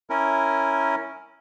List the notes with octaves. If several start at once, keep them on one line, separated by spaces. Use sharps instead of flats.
C#4 E4 A#4